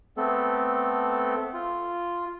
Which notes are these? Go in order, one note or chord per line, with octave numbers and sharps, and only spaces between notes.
A3 B3 C4 A4
F4